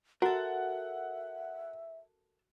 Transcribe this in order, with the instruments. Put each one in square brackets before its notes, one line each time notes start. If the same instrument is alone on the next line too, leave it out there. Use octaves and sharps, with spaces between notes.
[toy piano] F#4 [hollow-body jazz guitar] A4 A#4 [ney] E5 [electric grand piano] F#5